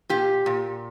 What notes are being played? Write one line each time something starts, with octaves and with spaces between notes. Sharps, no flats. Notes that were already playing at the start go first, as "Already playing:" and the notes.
A#2 G4
A#2